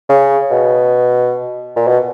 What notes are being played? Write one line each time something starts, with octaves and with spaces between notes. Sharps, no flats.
C#3
B2
A#2
B2